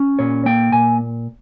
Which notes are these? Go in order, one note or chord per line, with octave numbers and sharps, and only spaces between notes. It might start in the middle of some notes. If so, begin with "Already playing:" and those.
Already playing: C#4
A#2 C#5
A#3 G5
A#2 G#5